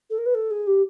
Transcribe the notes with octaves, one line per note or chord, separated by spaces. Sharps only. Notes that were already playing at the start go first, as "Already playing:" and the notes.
A4
A#4
B4
A4
G#4
G4